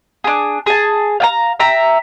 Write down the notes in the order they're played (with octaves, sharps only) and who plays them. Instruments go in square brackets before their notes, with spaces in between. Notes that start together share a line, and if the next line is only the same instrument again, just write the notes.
[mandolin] D4 G#4
G#4 A5
F5 G5 A#5
E5 G5 A#5